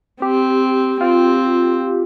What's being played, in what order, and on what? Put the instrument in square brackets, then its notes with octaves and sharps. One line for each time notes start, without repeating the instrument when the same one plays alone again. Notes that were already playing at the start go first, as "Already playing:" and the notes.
[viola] C4 [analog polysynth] G4
[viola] C4 [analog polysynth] F4